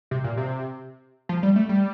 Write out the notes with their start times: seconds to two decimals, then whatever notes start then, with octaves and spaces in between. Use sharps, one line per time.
0.11 C3
0.24 A#2
0.37 C3
1.29 F3
1.43 G3
1.56 A3
1.69 G3